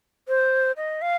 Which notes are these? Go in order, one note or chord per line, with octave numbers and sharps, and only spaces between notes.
C5
D#5
F5